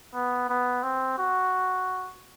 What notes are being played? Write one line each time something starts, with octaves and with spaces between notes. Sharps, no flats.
B3
B3
C4
F#4